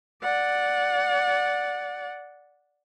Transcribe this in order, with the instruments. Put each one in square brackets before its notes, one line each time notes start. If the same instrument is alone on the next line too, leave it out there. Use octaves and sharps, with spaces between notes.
[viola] D5 F#5